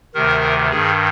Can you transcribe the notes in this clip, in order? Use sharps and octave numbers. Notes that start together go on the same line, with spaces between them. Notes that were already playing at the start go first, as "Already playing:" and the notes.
D2 C3 D#3 A#4
G2 D#3 G#4